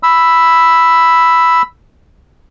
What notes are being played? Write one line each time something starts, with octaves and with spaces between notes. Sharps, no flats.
B5 E6